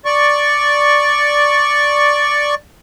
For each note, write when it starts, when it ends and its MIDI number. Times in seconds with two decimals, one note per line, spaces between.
0.05 2.55 74
0.05 2.55 85